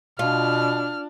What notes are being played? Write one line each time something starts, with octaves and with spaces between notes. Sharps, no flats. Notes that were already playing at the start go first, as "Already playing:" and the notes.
B2 D4 F4 F6